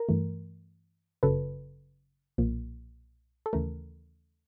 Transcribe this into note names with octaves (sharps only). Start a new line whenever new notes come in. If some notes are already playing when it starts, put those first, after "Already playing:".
Already playing: A#4
G2 E3 A3
G1 F#2 C#3 F#3 A4 B4
B1 A#2 F3 A#3
A4
D#2 C#3 E3 A3 A#4